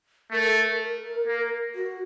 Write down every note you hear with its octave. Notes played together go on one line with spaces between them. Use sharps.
A3 A#4
A4
A#4
A#3
F#4